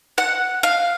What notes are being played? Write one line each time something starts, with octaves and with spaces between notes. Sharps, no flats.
F#5
F5